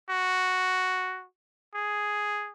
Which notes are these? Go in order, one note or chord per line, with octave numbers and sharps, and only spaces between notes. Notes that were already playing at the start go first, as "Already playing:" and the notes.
F#4
G#4